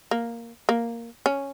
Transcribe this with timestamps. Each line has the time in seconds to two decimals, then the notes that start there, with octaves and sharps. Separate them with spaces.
0.11 A#3
0.69 A#3
1.26 C#4